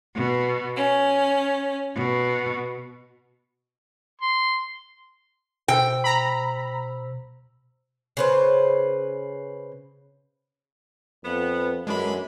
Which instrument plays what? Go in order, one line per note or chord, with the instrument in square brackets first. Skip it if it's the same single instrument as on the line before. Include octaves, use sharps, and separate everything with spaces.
[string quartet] B2
C#4
B2
[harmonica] C6
[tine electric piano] B2 C5 E6 [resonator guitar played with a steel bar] G5
[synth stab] A#5 B5
[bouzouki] C#3 B4 C5
[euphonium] F2 [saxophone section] B3
[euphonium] F#2 [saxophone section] D3 E3 D4 [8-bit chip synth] G#3 B5